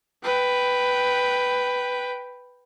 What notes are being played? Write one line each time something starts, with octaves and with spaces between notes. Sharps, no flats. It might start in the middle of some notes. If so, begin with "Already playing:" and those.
B4 G5